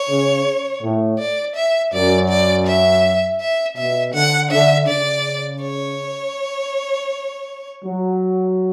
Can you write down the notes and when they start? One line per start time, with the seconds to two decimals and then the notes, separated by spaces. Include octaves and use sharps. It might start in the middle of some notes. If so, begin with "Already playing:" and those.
Already playing: C#5
0.09 C#3
0.82 A2
1.19 D5
1.56 E5
1.93 F#2 D5
2.29 D5
2.67 E5
3.40 E5
3.77 B2 E5
4.14 D3 F#5
4.51 D3 E5
4.88 C#3 D5
5.62 C#5
7.83 F#3